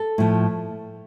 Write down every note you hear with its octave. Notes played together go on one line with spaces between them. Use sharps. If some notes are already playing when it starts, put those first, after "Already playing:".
Already playing: A4
A2 F3 A3